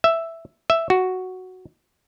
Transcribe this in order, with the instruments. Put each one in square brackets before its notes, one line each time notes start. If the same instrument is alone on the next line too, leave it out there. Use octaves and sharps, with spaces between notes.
[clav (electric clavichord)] E5
E5
F#4